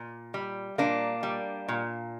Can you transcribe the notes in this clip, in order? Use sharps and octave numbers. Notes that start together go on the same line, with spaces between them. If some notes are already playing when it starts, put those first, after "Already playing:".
Already playing: A#2
G3
A#2 A#3 D4
G3
A#2